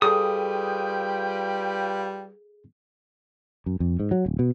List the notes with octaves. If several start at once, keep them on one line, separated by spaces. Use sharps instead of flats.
G3 F4 G#4 A4 B4 G5 D#6
F#2
F2
G#2
F#3
D1
B2